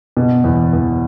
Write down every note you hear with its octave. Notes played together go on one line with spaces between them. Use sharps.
B2
E2
E2